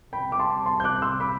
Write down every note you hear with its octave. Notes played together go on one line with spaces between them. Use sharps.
C2 C3 G3 C4 G5 B5
D6
A5 C6
A5 C6
G6
D6 F#6
F#6
C6 E6
B5 D6